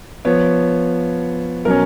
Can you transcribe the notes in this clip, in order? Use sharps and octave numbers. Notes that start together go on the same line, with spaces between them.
F3 B3 C#5
B2 F#3 C#4 A#4